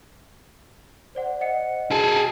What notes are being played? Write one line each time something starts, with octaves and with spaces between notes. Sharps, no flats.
C5 D5 F#5
D#5 F#5 C#7
F#4 G#4 A4